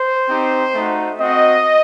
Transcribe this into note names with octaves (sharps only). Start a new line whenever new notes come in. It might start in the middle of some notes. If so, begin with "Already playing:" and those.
Already playing: C5
C4 D#4 G4
A3 D#4 F#4
C4 F#4 D#5